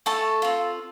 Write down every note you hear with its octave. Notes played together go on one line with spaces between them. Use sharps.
A3 A4 A5
C4 F4